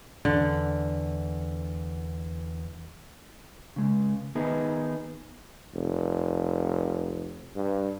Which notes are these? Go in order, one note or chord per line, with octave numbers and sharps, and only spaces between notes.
E2 D3
C#3 G#3
D#3 B3 D#4 G#4
F1
G2